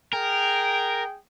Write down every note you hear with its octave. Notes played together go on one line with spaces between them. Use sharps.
G#4 A#4 G5